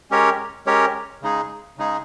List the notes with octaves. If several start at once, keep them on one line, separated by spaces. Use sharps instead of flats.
G#3 C#4 G4 A#4 C#5
G#3 C#4 G4 A#4 C#5
C#3 G#3 D#4 G#4
C#3 G#3 D#4 G#4